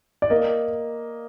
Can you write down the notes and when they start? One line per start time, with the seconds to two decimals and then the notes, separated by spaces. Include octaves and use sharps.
0.22 D5
0.30 A#3 D#5